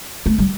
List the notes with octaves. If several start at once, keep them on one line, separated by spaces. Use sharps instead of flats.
A3
G3